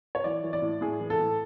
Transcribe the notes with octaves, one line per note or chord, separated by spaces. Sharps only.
C#5
E3 D5
E3
D5
A2
A2 G#4
E3
A4
A2